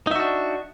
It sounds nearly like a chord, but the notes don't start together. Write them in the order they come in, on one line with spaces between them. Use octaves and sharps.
D#4 E5 F#4 D4